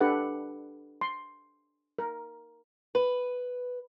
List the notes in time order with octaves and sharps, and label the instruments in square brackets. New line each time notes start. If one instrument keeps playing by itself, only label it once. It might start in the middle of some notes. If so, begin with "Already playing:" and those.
[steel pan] D4 G4 A4 B4 F#5
C6
A#4
[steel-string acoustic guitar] B4